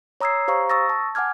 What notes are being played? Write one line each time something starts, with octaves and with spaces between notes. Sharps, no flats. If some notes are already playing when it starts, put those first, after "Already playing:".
C#5 A#5 D#6 E6 G#6 C7
G4 C5 F5 A#5 C#6
C#6 D#6 E6 A6 A#6
A5
F#5 G#5 D6 F6 G#6